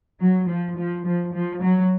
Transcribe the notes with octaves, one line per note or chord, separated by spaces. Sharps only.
F#3
F3
F3
F3
F3
F#3